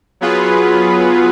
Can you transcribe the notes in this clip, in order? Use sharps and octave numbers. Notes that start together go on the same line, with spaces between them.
F#3 B3 F4 G#4 B4